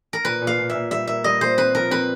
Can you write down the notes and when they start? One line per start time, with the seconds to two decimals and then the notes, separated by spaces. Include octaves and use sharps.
0.13 A#4
0.25 A#2 B4
0.41 A#2
0.47 F5
0.59 A#2
0.70 A#2 E5
0.91 G3 E5
1.08 A#3 E5
1.24 G3 D#5
1.41 A#2 C5
1.58 C4 B4
1.75 F3 A#4
1.91 C4 B4